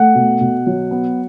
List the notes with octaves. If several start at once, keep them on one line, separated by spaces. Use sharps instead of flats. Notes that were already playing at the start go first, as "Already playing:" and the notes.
Already playing: A3 F#5
B2
B2
F#3
B3